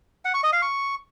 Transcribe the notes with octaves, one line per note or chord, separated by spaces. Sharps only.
F#5
C#6
D#5
F5
C#6